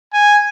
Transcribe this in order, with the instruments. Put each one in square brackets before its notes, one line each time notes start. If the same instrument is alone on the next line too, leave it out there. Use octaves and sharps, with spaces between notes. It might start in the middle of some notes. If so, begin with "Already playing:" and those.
[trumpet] G#5